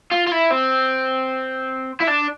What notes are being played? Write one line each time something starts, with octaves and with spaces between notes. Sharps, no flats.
F4
F4
E4
C4
E4
D4